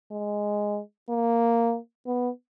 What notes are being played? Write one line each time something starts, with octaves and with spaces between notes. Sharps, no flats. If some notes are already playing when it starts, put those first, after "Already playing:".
G#3
A#3
B3